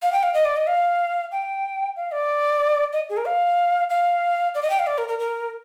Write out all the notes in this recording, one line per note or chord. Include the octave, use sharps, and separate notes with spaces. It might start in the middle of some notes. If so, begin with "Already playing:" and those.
F5
G5
F5
D#5
D5
D#5
F5
G5
F5
D5
D#5
G#4
A#4
F5
F5
D5
D#5
G5
F5
D5
A#4
A#4
A#4